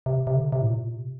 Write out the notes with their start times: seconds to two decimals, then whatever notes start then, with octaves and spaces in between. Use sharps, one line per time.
0.06 C3
0.27 C3
0.36 D3
0.52 C3
0.62 A2
0.67 A#2
0.97 C3